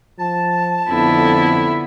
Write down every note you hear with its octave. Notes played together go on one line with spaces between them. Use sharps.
F3 A5
F2 D3 B3 E4